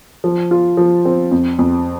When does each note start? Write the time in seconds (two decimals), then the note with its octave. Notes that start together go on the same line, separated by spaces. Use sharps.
0.24 F3
0.51 F4
0.77 F3
1.05 C4
1.31 F2
1.59 F2